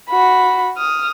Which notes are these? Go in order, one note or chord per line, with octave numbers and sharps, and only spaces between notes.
F#4 B5
D#6 F6